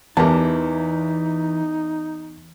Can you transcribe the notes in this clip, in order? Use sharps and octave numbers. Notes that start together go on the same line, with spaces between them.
E2 E3 D#4 G4 A#4 A5